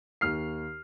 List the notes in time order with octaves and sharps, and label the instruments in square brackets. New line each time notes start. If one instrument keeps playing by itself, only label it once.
[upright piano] D#2 F6 C7